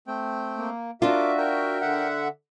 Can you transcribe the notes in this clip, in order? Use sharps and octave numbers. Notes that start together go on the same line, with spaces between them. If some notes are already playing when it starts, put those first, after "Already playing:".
A3 C4 G5
A#3
D4 F4 F#4 A#4 E5 D6
A#4 G5
D3 E5 F#5